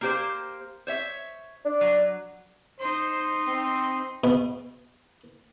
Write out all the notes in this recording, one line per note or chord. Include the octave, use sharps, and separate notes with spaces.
A#3 G4 C5
C5 C#5 E5
D4
F#3
D#4 C5 C6
C4
B2